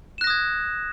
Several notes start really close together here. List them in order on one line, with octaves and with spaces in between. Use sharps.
E7 F#6 A#6 D#6 G#6